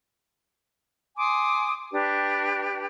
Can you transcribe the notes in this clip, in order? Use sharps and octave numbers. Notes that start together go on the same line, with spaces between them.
G#5 C6 D6 D#6
D4 G4 B4